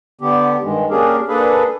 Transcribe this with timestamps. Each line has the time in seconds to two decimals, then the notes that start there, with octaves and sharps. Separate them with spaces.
0.21 D3 B3 G4
0.63 G2 D#3 G#3
0.90 A#3 C#4 D4 G4 G#4 A#4
1.28 A#3 D4 G#4 A4 B4